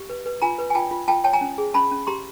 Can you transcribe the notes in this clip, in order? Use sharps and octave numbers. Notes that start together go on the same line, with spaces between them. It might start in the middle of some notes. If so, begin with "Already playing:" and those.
Already playing: G4
B4
B4
F4 G#5 A#5
B4
G#5
F4 G5 A5
F4
F4 G5 A5
C#5 G5 A5
G#5 A#5
C#4
G#4
C#4 A5 B5
C#4
G4 A#5 C6